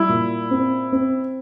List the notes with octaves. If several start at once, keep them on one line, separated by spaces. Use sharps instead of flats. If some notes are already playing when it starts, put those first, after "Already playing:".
Already playing: G3 E4
A#2
C4
C4